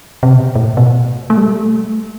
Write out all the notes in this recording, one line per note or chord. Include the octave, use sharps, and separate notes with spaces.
C3
B2
A2
B2
A3
G3
A3